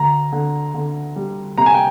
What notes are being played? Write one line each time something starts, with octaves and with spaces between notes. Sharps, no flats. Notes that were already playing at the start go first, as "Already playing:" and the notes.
Already playing: D2 A#5
D3
D3
G3
C3 A#5
G#5
G5